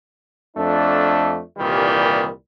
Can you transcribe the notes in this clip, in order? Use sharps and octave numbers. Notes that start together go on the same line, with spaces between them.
F2 A3 D4
C2 A#2 D#3 E3 G3